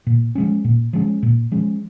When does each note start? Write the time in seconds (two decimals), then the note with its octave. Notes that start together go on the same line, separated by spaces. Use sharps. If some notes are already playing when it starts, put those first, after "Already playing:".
0.07 A#2
0.35 F3 G#3 C#4
0.64 A#2
0.93 F3 G#3 C#4
1.23 A#2
1.52 F3 G#3 C#4